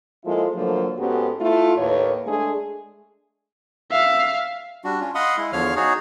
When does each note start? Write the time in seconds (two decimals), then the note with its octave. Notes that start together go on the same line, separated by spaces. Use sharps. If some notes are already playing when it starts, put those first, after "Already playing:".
0.24 F3 G#3 A#3 E4 F4 A4
0.55 D3 F3 F#3 A3 A#3
0.98 G#2 B3 C#4 F#4 G4 A4
1.40 A3 E4 F4
1.77 D#2 A2 A#3 B4 C#5
2.25 G#3 A3 D4 G#4
3.92 E5 F5
4.84 G3 D4 F#4
5.00 C#4 F4
5.15 D#5 F5 F#5 B5 C6 D#6
5.37 G#3 E4
5.53 E2 D3 F3 C#5 F5 F6
5.76 D#4 F#4 G#4 C#5